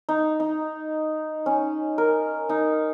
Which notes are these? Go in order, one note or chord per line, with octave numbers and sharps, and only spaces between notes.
D#4
D#4
C#4
A#4
D#4